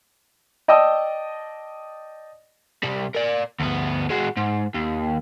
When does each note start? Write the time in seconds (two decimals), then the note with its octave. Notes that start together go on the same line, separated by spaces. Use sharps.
0.68 D5 D#5 G5 A5 D#6 E6
2.83 C3 G3
3.14 A#4 D5
3.60 D2 B3
4.10 G#3 F#4
4.37 G#2
4.74 D#2